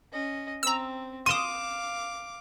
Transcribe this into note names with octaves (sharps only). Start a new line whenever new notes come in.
C#4 D#5
C4 A#5 E6
F5 C6 D6 D#6 D#7 E7